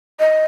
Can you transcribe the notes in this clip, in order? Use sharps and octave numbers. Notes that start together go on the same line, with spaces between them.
D#5